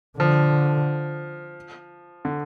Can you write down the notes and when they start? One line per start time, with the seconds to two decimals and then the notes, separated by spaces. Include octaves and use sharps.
0.19 D3 F3
2.25 D3